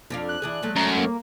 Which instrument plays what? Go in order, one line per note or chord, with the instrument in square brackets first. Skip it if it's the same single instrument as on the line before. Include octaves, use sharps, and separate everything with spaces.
[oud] F2 D4 F5
[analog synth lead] F#6
[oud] E3 D4 G#4
F#3 G#3 A3
[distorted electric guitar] F#2 [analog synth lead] A#5
[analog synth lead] A#3